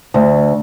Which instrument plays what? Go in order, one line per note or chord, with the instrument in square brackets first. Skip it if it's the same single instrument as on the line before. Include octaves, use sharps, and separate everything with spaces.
[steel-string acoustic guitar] D2